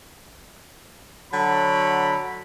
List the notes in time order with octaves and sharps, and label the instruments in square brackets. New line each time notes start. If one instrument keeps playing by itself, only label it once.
[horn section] D3 F#3 B5